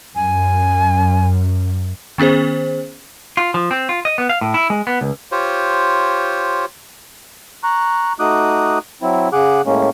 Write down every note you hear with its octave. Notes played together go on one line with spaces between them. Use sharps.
F#2 G#5
D#3 B3 C#4 G#4 C5
F4
F3
C4
F4
D#5
B3
F5
A2
E4
G#3
B3
C#2
F4 G4 C5 C#5
A#5 C#6 F#6
A3 D#4 F#4 D6 D#6 F#6
F#3 C4 E4
C#3 G#4 F#5 D6 F#6
A2 G#3 A#3 C#4